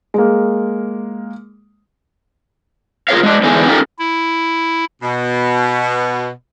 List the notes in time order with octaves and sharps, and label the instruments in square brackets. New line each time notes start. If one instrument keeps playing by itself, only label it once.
[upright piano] G#3 A#3
[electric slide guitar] F4 G#4 A#4 C#5 F5
G#3 D4
E2 D3 E3 G#3 D#4 G#5
C#4 D#4 F4 G4 A4 A#4
[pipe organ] E4
[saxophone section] B2